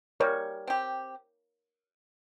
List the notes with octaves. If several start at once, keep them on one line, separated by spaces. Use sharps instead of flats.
G3 A#4 C#5
C4 G4